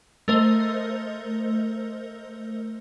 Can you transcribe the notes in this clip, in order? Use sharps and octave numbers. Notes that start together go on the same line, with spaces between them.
A3 A#4 C5 D#5